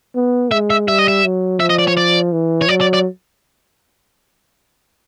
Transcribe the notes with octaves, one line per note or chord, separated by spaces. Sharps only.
B3
G#3 E5
E5
G3 E5
D#5
E5
F#3
F3 E5
D#5
D5
C#5
D5
E3
C#5
F#3 D5
D5
D5